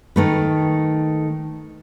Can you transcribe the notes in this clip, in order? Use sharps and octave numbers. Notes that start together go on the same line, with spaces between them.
D#3 A3 B4